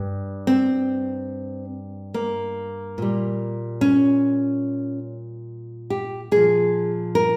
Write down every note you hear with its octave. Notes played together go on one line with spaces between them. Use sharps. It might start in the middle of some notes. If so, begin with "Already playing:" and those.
Already playing: G2
C4
A#3
A#2 G3
C#4
G4
A#2 F3 G#4
A#4